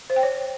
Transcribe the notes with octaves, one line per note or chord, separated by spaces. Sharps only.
C5
G5
C#5